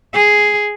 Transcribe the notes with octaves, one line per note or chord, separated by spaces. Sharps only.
G#4